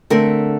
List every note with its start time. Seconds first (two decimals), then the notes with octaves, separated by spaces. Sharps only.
0.10 D3 A3 C4 A#4